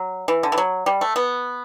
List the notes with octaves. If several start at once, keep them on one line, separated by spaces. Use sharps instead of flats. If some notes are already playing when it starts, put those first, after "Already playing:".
Already playing: F#3
E3
D3
E3
F#3
G3
A3
B3